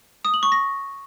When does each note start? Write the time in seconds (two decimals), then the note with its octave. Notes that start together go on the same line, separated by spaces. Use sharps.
0.25 D#6
0.34 F#7
0.43 C#6
0.52 A#6